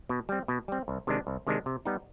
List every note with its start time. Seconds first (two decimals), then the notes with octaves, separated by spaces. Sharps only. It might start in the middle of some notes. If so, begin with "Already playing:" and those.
0.09 B2
0.29 G3 C4
0.48 B2
0.68 G3 C4
0.88 C2
1.07 C3 D#3 G#3 D4
1.27 C2
1.47 C3 D#3 G#3 D4
1.66 C3
1.85 G3 B3 D#4